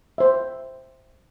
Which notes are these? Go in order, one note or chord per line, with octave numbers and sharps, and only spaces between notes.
C5 E5